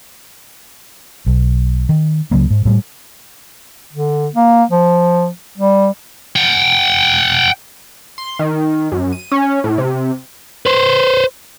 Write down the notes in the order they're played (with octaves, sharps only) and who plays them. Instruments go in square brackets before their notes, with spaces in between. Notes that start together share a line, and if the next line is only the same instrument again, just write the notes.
[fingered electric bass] B1
D#3
C#2 C#3 F#3 A#3
G#2
A2 F#3 G3
[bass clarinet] D3
A#3
F3
G3
[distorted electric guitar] F#5 G5
[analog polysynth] C6
D#3
F#2
D#7
C#4
A2
C3
[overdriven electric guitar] B4 C5